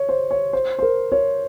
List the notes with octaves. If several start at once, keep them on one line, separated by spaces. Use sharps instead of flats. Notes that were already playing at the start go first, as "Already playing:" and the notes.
Already playing: C#5
C5
C#5
C5
C5
A#4
C#5